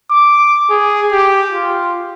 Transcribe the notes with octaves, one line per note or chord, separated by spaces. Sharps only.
D6
G#4
G4
F4